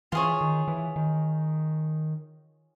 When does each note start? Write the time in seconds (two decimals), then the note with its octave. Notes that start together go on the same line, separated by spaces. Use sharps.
0.12 E3 F4 G#4 C#5
0.41 D#3
0.68 E3
0.96 D#3